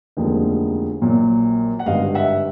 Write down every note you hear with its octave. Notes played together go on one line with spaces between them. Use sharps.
F1 D#2 D3 F3 G#3
A#1 A#2 F#3
F#5
G#1 G2 D3 D#5 F5
E5 F#5